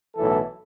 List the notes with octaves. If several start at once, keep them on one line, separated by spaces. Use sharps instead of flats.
B1 A2 E3 A4